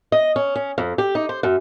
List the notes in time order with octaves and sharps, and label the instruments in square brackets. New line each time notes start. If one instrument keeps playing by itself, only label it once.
[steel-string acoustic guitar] D#5
C#4
C#4
F2
G4
D#4
C5
F#2